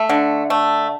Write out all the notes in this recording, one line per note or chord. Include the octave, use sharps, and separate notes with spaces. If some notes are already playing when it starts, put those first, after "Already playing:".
Already playing: A3
D3
A3